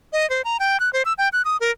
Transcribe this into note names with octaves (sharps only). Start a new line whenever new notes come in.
D#5
C5
A#5
G5
F#6
C5
E6
G5
F#6
D#6
A#4